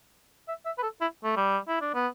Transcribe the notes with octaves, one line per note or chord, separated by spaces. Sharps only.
E5
E5
B4
A4
E4
A3
G3
E4
D4
B3